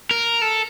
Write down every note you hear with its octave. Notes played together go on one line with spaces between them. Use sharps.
A#4
A4